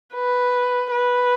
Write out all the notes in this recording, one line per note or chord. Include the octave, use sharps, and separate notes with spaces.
B4
B4